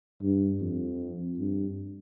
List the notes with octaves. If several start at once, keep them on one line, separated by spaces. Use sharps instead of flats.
G2
F2
G2